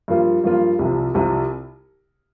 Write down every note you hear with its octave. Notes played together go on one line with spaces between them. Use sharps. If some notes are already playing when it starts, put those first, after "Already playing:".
G2 F3 A#3 F4
G2 F3 A#3 F4
C2 C3 F3
C2 C3 F3